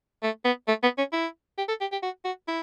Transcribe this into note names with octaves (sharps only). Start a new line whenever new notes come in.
A3
B3
A3
B3
C#4
E4
G4
A4
G4
G4
F#4
F#4
E4